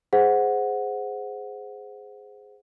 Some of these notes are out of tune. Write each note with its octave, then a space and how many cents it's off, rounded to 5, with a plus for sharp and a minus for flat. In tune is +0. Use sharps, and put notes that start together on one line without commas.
G#4 +0 C5 -10 F#5 -10